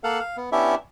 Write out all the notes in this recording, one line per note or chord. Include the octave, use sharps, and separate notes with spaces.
A#3 A4 F5 F#5
F5
B3
B3 C#4 D4 E4 G4 E5